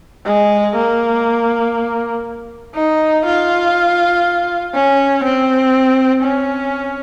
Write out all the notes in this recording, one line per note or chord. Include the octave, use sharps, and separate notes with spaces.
G#3
A#3
D#4
F4
C#4
C4
C#4